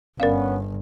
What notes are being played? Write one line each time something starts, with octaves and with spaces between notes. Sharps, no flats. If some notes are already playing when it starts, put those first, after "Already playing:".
G1 B3 C#4 A#4 D5 F5